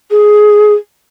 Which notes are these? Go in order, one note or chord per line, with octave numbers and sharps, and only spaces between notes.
G#4